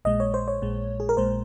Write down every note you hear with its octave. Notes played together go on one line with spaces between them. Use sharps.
A#1 A#2 G#3 D#5
C#5
C5
C#5
A#1 A#2 G#3
G#4
A#4
A#1 A#2 G#3 C5